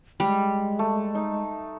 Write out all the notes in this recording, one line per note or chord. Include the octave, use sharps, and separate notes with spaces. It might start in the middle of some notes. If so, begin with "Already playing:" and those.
G3 G#3
A3
D#4